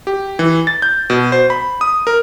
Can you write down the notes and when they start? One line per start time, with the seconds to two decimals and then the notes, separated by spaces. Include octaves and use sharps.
0.07 G4
0.39 E3
0.67 A6
0.82 G6
1.10 B2
1.32 C5
1.50 B5
1.81 D#6
2.07 A#4